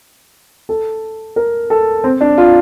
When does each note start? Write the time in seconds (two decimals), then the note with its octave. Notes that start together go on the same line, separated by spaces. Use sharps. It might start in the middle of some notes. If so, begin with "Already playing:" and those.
0.69 A4
1.36 A#4
1.70 A4
2.04 C4
2.21 D4
2.38 F4